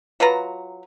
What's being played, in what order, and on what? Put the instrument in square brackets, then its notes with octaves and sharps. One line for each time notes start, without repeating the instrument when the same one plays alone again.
[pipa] F#3 F4 B4 A#5